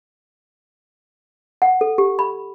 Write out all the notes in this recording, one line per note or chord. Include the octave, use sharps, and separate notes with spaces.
F#5
A4
G4
B5